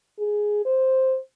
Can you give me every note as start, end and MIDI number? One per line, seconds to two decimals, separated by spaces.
0.19 0.64 68
0.65 1.17 72